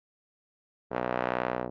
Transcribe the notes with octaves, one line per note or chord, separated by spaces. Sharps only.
B1